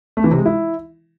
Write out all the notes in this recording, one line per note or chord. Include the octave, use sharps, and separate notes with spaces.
A3
E3
C3
G#3
E4